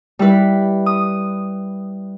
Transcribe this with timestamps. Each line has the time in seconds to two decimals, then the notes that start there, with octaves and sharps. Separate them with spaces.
0.19 G3 E4 B4
0.86 D#6